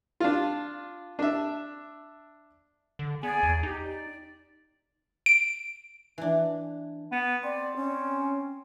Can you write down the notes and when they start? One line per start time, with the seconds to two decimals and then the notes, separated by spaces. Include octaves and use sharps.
0.20 D4 F4
1.19 D4 E5
2.99 D3
3.23 B3 G#4 D5 G#5
3.43 E2
3.63 D#4 G4
3.83 D5
5.26 D7
6.18 E3 D4
7.12 B3
7.44 C4 D5
7.76 C#4